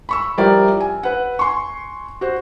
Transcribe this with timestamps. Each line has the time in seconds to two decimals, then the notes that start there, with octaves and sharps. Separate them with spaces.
0.09 B5 C#6 E6
0.37 F3 G3 E4 A#4 D5 G5
0.80 G#5
1.03 B4 F#5
1.39 G#5 C6 C#6
2.21 F#4 C5